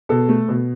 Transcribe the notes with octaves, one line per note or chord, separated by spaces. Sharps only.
B2 A4
A3
B2